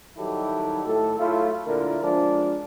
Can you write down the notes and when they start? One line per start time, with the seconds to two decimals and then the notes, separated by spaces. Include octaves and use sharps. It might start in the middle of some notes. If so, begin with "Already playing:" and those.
0.17 D#3 F#3 G3 E4 G4 A4
0.86 A2 A4
1.19 F#3 A3 E4 F4
1.66 A#2 D3 E4 A#4
2.02 F3 G#3 D4